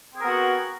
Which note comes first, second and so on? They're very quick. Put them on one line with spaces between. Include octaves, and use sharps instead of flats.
C4 G#4 A#4 B3 F#4